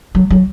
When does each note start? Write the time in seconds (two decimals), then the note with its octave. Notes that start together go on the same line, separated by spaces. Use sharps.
0.15 F#3
0.30 F#3